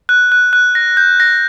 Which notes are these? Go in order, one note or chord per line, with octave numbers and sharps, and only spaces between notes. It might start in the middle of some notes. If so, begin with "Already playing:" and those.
F#6
F#6
F#6
A#6
G6
A#6